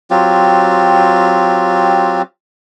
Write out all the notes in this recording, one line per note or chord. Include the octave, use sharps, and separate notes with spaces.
F#3 C4 F4 G4